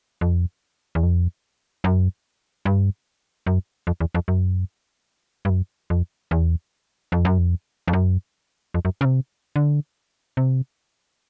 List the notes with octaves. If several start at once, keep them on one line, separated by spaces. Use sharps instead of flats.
F2
E2
F2
F#2
G2
F#2
F2
E2
F2
F#2
G2
F#2
F2
E2
F2
F#2
F2
F2
F#2
F2
F#2
C#3
C3
D3
C3